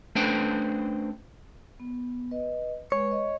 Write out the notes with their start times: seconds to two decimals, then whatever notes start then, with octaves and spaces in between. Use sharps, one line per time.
0.15 A3 C#4 D4 B4 C5 G5
1.80 B3
2.31 B4 D#5
2.92 G#3 B4 C#5
3.11 D#5